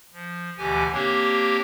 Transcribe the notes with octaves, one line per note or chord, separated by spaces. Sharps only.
F3
D2 B2 D3 E3 G4 G#5
A#3 C4 D4 G4 A#4 C#5